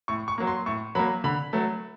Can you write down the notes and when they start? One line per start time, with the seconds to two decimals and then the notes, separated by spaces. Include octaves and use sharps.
0.08 A2 C#6
0.28 C#6
0.38 F#3 A#3
0.47 C6
0.66 A2 C#6
0.95 F#3 A#3 B5
1.24 D3 B5
1.53 F#3 A3